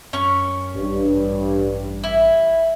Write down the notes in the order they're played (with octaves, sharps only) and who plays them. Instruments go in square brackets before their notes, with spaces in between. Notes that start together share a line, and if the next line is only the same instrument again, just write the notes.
[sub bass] F#2 [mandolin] C#4 C#6
[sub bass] A1 [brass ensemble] G2
[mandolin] E4